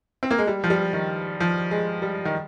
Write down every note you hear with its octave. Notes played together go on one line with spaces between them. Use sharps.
C4
A#3
G#3
G3
F3
G3
D#3
F3
G#3
G3
D#3